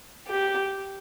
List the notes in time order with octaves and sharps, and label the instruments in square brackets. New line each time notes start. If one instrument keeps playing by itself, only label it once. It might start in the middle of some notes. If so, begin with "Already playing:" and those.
[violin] G4